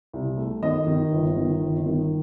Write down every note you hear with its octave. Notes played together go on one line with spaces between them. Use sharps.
C2
A3
D#3 D#5
D#3
G1
D#3
G1
D#3